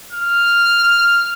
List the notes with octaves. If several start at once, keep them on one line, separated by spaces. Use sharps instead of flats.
F6